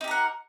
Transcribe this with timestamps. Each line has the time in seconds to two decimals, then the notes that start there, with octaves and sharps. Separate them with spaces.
0.01 D#4
0.04 G4
0.08 A#4
0.11 F#5